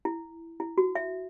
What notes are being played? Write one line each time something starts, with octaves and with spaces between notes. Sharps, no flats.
E4
E4
F#4
E5